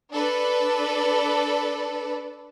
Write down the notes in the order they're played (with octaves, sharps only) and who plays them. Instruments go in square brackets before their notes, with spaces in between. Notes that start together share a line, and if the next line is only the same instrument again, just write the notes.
[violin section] D4 A4 B4 D5